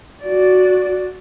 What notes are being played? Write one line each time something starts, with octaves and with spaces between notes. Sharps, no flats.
F#4 D5